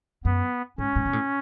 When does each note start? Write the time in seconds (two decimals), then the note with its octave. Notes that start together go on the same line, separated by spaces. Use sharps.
0.25 F#2 B3
0.78 G#2 C#4
0.96 G#2
1.06 B2
1.13 A2